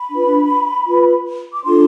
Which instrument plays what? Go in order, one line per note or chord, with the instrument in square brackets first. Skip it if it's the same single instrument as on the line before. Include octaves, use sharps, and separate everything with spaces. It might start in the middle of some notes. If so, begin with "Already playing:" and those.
Already playing: [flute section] B5
D4 F4 B4
F4 B4
D6
D4 F4 A4 C6